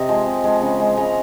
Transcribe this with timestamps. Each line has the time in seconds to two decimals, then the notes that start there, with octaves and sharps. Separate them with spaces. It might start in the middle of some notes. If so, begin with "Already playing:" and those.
Already playing: C3 D#5
0.09 F3 G#3
0.26 C3
0.44 F3 G#3
0.62 C#3
0.80 G#3
0.97 C#3 A#5